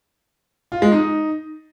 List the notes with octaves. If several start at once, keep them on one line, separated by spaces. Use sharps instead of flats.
F4
G#3
D#4